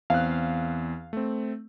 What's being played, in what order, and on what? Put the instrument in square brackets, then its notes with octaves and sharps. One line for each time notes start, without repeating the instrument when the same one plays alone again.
[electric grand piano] E2 C4 [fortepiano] F5 F#6
[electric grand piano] A3 C4